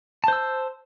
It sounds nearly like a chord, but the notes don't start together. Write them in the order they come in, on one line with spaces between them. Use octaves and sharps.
A5 C5 E6